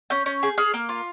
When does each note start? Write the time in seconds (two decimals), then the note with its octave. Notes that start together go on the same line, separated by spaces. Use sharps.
0.10 C#4 G6
0.26 C#4
0.43 G#4
0.58 G#4 F6
0.74 A#3
0.89 F4